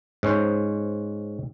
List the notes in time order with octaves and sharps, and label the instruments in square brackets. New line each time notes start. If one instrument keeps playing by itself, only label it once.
[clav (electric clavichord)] G#2 C#4 C5